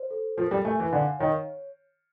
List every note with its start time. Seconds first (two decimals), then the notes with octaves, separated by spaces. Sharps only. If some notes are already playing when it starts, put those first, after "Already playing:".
Already playing: C5
0.11 A4
0.38 F3 A#4
0.51 G3
0.65 A3 G#5
0.80 E3
0.93 D3 F5
1.19 D#3 C#5